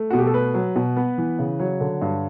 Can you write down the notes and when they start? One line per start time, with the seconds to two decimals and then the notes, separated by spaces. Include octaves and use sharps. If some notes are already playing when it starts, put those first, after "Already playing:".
Already playing: A3
0.10 B2 F#4
0.19 G4
0.26 A4
0.34 A3 B4
0.54 F#3
0.76 B2
0.96 B3
1.18 E3
1.39 C#3
1.59 F#3 C#5
1.80 D3
2.02 G2